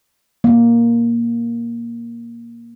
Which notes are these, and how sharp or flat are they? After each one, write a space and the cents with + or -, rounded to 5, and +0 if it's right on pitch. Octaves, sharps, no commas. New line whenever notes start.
A#3 +5